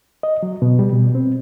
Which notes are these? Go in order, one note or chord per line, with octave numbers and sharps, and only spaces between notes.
D#5
F#3
B2
G3
B2
C4